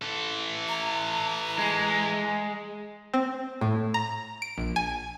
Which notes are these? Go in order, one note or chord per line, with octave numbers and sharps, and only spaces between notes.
E3 A4
A#5
G#3
C4
A2
A#5
D7
A#1
G#5